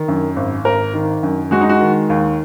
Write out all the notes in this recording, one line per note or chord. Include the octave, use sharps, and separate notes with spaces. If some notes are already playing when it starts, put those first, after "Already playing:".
Already playing: D#3
F#2
G#1
G#1 A#4
D#3
F#2
G#3 F#4
D#4
F#4
D#3
D#2